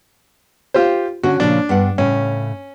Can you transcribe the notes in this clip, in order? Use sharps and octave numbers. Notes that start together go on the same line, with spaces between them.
F4 G4 C5
D3 C#4 F#4
A#2 C#3 F3 D4
G2 B3 F#5
A2 C#3 C#4